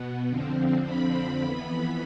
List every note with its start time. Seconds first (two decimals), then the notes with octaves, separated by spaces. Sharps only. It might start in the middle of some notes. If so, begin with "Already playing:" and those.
Already playing: B2 B3
0.28 F2 D3 F3 C4
0.85 B5
1.43 F2 E3 B3